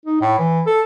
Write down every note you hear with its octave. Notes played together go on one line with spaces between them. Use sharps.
D#4
A2
E3
A4